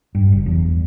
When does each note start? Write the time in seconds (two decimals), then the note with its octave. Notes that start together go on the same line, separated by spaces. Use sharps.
0.15 G2
0.32 F#1
0.46 E2